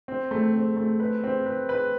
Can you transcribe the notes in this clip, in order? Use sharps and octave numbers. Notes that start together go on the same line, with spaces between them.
C4
A3
C4
A3
B4
C4
B4
B4